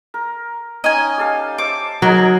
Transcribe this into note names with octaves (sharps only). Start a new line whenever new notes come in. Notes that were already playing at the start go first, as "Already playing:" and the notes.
A#4
C#4 D#4 D#5 G#5
G4 A4 F5
C5 E5 D6
F#3 D#4 G#4 A#4